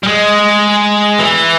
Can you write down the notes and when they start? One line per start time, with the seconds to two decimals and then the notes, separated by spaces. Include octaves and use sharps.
0.03 G3
0.07 G#3
1.19 E3